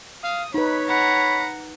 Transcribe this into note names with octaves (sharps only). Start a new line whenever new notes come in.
F5 D#6
D#4 B4 C#5 B5
F#5 A#5 B5